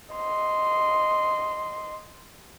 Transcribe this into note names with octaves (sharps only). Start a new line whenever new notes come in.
D#5 C6